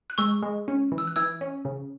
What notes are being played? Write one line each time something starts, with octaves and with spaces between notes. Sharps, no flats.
F#6
G#3 C#6 E6
G#3
C#4
E3
E6
F#6
E3 E6 G#6
C#4
C#3